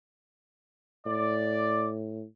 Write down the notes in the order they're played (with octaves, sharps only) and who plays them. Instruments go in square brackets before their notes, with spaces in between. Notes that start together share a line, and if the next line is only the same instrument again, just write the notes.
[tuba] A2 [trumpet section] D5